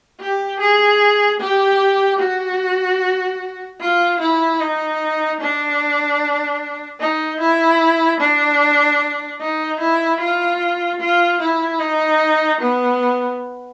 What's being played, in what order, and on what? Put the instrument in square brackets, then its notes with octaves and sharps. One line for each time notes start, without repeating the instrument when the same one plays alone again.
[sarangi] G4
G#4
G4
F#4
F4
E4
D#4
D4
D#4
E4
D4
D#4
E4
F4
F4
E4
D#4
B3